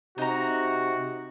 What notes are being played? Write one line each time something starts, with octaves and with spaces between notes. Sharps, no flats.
C3 D#4 F#4 A#5